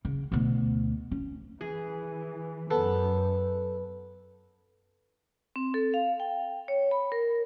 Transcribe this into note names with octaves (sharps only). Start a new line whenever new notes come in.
C#3
D2 B2
C#4
E3 G#4
F#2 B3 A4
C4
A4
F5
G5
C#5
B5
A#4